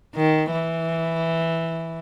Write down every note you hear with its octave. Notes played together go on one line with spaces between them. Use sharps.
D#3
E3